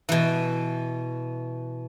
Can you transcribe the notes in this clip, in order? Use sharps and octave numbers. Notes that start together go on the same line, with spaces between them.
B2 E3